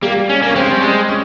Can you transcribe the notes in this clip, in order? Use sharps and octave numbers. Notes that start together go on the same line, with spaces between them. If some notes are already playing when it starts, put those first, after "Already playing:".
G3 A#3
C#4
A#3
C#4
G#3 C4
G3
G#3
C#4